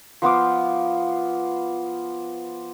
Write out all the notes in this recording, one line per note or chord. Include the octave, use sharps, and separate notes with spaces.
F3 B3 F4 D6